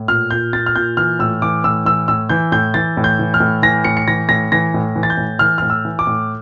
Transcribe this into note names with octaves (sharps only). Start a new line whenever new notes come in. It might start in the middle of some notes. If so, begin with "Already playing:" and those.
Already playing: A2
A#2 F6
A#2 G6
A#2 A6
F6
A#2 G6
E3 F6
A2 E6
E3 D6
A2 E6
E3 E6
A2 E6
E3 G6
A2 G6
E3 A6
A2
G6
E3
F6
A2
E3 A#6
A2 C#7
C#7
E3 A#6
A2 A#6
E3 A#6
A2
E3
A6
G6
A2
E3 F6
A2 F6
E6
E3
D6
A2